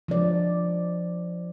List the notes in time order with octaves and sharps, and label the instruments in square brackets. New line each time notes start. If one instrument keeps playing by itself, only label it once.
[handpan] F3 G#3 D5